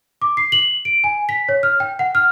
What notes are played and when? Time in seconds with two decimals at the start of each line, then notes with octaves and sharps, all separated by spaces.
0.22 D6
0.37 C7
0.52 F#7
0.85 D7
1.04 G#5
1.29 B6
1.49 C#5
1.63 F6
1.80 G5
1.99 F#5
2.15 F6